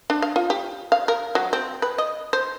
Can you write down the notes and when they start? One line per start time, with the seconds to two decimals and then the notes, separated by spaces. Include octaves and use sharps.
0.10 D4
0.22 F5
0.36 F4
0.50 G4
0.92 F5
1.08 A#4
1.35 F#3
1.53 C4
1.82 B4
1.98 D#5
2.33 C5